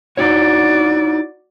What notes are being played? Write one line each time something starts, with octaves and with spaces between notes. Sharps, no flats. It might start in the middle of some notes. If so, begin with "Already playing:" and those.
D#4 E4 F#4 C#5 D5